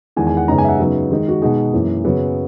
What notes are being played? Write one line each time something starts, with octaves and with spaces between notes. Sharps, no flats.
E2 D#3 G#3 G#5
G#5
F#5
F#2 C#3 G#3 B3 D#4 A#5
G#5
E5
F#5
C#3 F#3 B3 D#4
D#3 G#3 D#4
F#4
B2 G#3 D#4 G#4
F#2 E3 A#3
F#2 C#3 F#3 B3